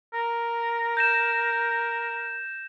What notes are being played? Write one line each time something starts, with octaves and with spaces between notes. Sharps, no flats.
A#4
G6 A#6 E7